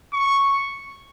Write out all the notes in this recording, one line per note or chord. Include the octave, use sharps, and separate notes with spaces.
C#6